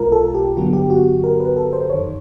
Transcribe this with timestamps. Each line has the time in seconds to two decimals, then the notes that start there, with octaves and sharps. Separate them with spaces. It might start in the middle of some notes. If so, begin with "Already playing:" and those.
Already playing: B1 B2 G#3 F4 A#4
0.12 A4
0.34 G4
0.57 A1 G2 D3 F#3 B3 F#4
0.73 G4
0.90 F#4
1.24 A#4
1.40 B4
1.57 A4
1.73 C5
1.89 G1 F#2 D#3 C#5